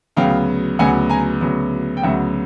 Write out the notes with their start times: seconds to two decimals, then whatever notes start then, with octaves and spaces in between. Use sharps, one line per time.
0.17 D2 C#3 F#3 B3 F5 G5
0.79 D2 C#3 F#3 B3 F#5 G#5
1.10 G#5 A#5
1.41 D2 C#3 F#3 B3
1.97 G5
2.03 D2 C#3 F#3 B3 E5 F#5